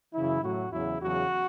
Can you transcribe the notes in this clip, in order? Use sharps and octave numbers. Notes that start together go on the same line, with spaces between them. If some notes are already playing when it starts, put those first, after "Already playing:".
F#2 C#3 E3 E4
A2 F#3 F#4
E2 C#3 F#3 E4
E2 C#3 F#3 F#4